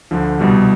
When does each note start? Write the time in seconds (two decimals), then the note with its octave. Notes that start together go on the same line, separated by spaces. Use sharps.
0.11 D2 D3 F3
0.39 C2 B2 G3